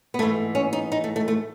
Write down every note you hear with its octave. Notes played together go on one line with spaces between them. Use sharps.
B3
G#2 E3 A3
C#4
D#4
D#4
A3
A3
A3